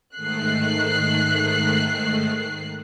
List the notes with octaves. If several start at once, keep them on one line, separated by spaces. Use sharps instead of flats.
G#2 D#3 A3 F#6 C7